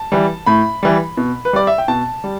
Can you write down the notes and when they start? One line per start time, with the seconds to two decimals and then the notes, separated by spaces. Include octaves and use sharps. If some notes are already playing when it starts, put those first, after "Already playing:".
Already playing: A5
0.12 E3 G3
0.47 A2 B5
0.83 E3 G3
1.17 B2
1.45 B4
1.53 G3 D5
1.67 E5
1.78 G5
1.88 B2 A5
2.24 G3